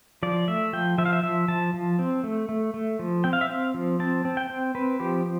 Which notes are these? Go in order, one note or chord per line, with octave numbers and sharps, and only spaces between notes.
F3 D5
A3 E5
F3 G5
F3 E5
F5
E5
F3 E5
F3 A5
F3
C4
A3
A3
A3
F3
C4 G5
F5
E5
C4 F5
F3
C4 A5
C4
G5
C4
C4 B4
F3 G4